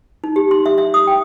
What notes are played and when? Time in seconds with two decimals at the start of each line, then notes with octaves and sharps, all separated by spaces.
0.24 D#4
0.36 G4
0.51 C6
0.66 E5
0.78 E5
0.94 D#6
1.07 G5